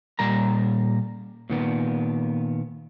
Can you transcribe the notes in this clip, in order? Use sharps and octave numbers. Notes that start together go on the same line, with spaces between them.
A#2 G3 A#4 A#5
A#2 D#3 B3